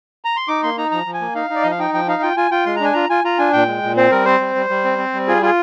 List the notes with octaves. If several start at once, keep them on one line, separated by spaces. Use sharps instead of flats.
A#5
C6
D#4 D6
A#3 C6
D#4 A#5
F3 A#5
F3
G#5
A#3
D#4 F5
D#4 D5
F3 D#5
F5
D#4 G5
F3 G5
D#4 F5
F4 G5
F4 G#5
F4 G5
G#3 C6
A#5
D4 G#5
F4 A#5
F4 G#5
F4 A#5
D4 G#5
A#2 G5
G#3
A#2
C4 C5
G3 A#4
C4 C5
G3
G3
G3
C4
C4
G3
F4 G#4
F4 G#4